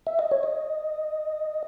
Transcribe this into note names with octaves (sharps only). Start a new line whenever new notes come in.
E5
D#5
C#5
D#5